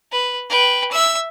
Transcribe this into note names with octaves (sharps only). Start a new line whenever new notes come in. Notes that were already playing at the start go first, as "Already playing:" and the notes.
B4
B4 G5
E5 E6